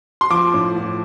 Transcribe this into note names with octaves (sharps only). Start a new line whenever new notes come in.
C6
F3 D6
A2
F3